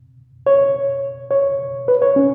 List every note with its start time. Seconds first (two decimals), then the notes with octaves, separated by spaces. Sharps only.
0.47 C#5
1.31 C#5
1.88 B4
2.02 C#5
2.16 C#4